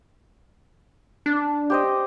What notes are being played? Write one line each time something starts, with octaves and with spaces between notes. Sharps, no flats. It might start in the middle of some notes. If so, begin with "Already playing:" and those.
D4
G4 C5 D#5